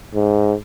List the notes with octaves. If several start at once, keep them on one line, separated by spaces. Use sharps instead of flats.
G#2